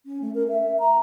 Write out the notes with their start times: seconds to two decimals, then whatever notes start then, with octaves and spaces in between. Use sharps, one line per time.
0.06 C#4
0.22 A3
0.35 A#4
0.49 E5
0.79 A#5